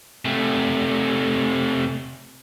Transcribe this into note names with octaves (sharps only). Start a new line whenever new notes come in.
C3 A3